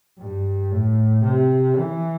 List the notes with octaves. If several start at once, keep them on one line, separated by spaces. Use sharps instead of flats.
G2
A2
C3
E3